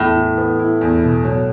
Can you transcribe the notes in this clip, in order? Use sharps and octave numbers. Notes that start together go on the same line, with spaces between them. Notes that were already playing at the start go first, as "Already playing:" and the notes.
Already playing: E2 A2
E3
B3
E4
E2
B2
F#3